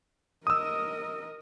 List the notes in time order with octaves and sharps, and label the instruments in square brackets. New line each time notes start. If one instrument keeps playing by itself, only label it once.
[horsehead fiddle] A#4 D#5 [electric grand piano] D#6 E6